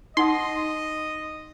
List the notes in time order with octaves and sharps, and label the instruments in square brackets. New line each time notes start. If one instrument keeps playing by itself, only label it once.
[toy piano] D#4 F#5 D#6 [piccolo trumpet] D#5 [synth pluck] C6